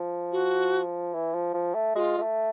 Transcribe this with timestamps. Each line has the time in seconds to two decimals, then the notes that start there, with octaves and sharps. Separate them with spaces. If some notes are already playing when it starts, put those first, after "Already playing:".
Already playing: F3
0.32 F#4
1.14 E3
1.34 F3
1.54 F3
1.74 A3
1.95 G#3 F4 F#4
2.18 G#3
2.22 A3